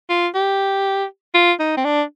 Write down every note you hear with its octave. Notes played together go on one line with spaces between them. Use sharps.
F4
G4
F4
D#4
C4
D4